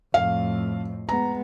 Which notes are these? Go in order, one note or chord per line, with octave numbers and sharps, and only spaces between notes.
F2 A2 F5
G#3 B3 A#5